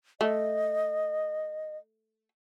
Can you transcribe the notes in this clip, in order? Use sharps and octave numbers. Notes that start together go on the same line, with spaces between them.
A3 D#5